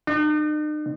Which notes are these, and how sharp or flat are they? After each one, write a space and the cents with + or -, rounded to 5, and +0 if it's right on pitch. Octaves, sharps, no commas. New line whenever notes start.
D#4 -45